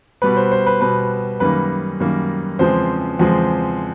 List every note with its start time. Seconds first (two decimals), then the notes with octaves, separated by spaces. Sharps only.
0.22 B2 G3 B3 B4
0.37 C5
0.51 C5
0.66 B4
0.81 B2 G3 B3 B4
1.40 F#2 D#3 G3 A#3 B4
2.00 F#2 D#3 G3 A#3
2.59 E2 C#3 F3 G#3 C4 C5
3.19 E2 C#3 F3 G#3 C4